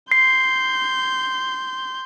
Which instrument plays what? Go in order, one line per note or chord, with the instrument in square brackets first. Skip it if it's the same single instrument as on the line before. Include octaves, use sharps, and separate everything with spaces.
[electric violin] C6 G6 [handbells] C7